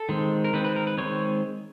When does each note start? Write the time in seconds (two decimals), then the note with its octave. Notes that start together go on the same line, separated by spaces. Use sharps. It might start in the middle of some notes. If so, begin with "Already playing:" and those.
Already playing: A4
0.09 D#3 G#3 C4
0.44 A#4
0.53 D#3 G#3 C4 B4
0.64 B4
0.76 A#4
0.87 B4
0.98 D#3 G#3 C4 C#5